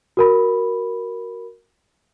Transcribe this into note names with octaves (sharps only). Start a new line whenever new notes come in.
F#4 A#4 B5